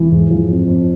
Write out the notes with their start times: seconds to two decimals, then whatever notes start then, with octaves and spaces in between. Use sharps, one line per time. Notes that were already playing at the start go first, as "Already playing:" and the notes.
Already playing: E3
0.12 G#2
0.30 F3
0.49 F2
0.67 F2